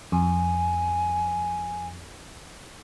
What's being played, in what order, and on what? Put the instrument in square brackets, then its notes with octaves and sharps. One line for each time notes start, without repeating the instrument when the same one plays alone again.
[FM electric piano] F2 [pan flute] G#5